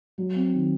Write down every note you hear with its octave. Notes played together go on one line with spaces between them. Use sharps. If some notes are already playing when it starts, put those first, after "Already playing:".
F#3
C4
D#3